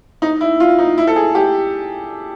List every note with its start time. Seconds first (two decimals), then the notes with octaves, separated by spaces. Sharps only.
0.22 D#4
0.41 E4
0.60 F4
0.79 D#4
0.98 E4
1.07 A4
1.16 G#4
1.35 G4